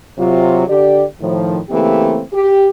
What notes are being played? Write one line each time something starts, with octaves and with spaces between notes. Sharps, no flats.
C3 F#3 F4
D3 G4 D5
A2 D#3 F3
C#3 E3 A3 A#3 C4 G4
G4